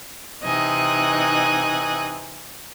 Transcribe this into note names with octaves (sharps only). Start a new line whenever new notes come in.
C3 E3 D#4 D#5 G#5 F#6